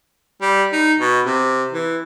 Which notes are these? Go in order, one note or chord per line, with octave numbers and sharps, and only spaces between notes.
G3
D#4
B2
C3
E3